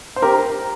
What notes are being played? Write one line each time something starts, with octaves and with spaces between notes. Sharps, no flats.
C5
G4 A#4